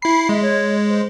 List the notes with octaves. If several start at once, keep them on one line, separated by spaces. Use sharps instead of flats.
E4 B5 C7
G#3 E5
C#5
C5